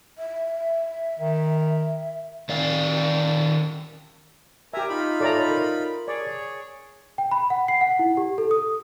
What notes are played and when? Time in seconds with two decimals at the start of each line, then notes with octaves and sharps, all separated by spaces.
0.18 E5
1.19 D#3
2.49 D#3 D5 F5
4.74 G4 A#4 E5 G#5 A#5
4.89 D#4 F4 B5
5.20 A4 C#5 D5 E5 A#5
5.50 A#4
6.08 G#4 C#5 D5
7.18 G5
7.31 B5
7.50 F#5
7.68 C7
7.81 F#5
7.99 E4
8.17 G4
8.38 A4
8.51 D#6